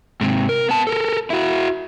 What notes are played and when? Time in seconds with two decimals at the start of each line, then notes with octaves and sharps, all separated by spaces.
0.21 G#2 C3
0.49 A#4
0.68 B3 A5
0.87 A4 A#4
1.30 E4 F#4